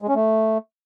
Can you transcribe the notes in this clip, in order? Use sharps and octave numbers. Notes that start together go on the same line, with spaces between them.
G#3
C#4
A3